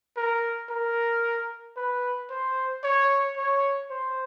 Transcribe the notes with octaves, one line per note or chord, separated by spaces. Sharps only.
A#4
A#4
B4
C5
C#5
C#5
C5